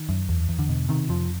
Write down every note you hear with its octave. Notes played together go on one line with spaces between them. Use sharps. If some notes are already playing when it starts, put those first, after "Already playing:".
Already playing: D#3
F#2
E2
E2
D3
B2
C3 D#3
F2 F3